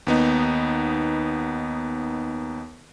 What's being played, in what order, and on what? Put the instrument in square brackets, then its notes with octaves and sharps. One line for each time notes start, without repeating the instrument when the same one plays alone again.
[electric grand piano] D#2 B3 D#4